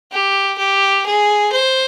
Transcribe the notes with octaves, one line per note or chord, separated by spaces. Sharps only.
G4
G4
G#4
C5